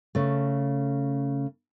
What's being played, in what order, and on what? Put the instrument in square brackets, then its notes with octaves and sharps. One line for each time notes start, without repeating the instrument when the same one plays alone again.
[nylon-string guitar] C#3 A3